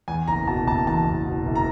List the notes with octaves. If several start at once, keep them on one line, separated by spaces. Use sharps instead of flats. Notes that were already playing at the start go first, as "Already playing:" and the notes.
E2 G#5
F#1 A#5
B2 A5
F#1 A5
E2 A5
F#1
B2
F#1
A#5